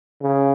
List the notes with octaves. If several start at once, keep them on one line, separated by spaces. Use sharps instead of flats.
C#3